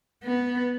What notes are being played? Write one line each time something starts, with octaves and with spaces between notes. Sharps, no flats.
B3